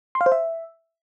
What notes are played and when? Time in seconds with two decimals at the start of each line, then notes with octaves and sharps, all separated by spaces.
0.15 C6
0.21 F5
0.26 C5
0.32 E5